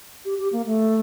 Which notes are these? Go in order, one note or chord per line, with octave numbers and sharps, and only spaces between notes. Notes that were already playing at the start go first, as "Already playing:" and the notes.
G4
G4
A#3
A3